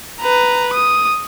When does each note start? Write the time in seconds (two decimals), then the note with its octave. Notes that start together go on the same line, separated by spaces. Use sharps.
0.21 B4 A#5
0.74 D#6